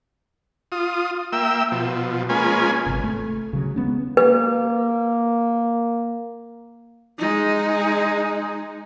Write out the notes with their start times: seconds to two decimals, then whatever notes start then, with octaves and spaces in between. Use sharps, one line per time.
0.72 F4 D#6
1.32 A#3 E5 G5 E6
1.72 B2 F3
2.29 G#3 A#3 C#4 F4 B4 G#5
2.86 G#1 C3
3.04 A3
3.53 C#3 F#3
3.76 G#3 B3 C#4
4.17 A#3 B4
7.18 G#3 D#4